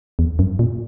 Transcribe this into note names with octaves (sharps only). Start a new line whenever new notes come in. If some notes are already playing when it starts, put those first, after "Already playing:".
E2
F#2
A#2